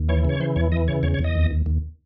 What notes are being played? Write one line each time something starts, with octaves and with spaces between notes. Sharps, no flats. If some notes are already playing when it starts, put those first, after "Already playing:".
Already playing: D#2
E3 C#5
C#3 C#5
E3 C5
E2 C#5
E3 D#5
C#3 C#5
E2 C#5
C#5
E2
D#5
D#2
D#2
D#2